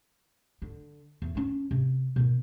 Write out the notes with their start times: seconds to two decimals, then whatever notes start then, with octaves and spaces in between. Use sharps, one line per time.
0.62 D3
1.22 E2
1.35 C#4 E4
1.71 C3
2.16 B2 D#3